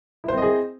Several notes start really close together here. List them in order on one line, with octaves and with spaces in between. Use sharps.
E4 C5 C4 D#5 G#4